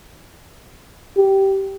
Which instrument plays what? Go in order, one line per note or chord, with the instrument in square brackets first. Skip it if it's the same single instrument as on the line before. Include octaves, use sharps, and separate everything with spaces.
[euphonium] G4